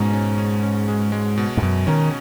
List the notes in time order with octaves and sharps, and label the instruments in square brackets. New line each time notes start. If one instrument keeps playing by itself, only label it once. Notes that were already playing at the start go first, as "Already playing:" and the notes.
Already playing: [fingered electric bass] G#2 [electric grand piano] B2 G#3 C#4
[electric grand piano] C#4
C#4
C#4
G#3
G#3
B2
[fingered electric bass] G#2
[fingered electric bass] F#2 [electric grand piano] B2
[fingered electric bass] D#3 [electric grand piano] C#4